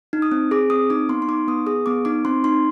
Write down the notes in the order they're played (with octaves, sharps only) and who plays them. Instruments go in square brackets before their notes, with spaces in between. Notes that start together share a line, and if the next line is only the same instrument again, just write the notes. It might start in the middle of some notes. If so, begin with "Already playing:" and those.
[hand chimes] D#4
D#6
C4
G#4 D6
C4 D#6
D#4 D6
B3 C6
C6
D#4 D6
B3 D#6
G#4 D#6
B3 D6
D#4 D6
C4 C6
D#4 C6